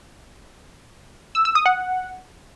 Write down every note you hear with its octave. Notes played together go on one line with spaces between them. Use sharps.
E6
E6
D#6
F#5